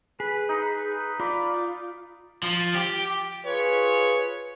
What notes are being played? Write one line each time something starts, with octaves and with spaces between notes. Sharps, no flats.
G#4 B4
D#4
B4
F4 D5 B5
F3
G4
F4 G#4 B4 C#5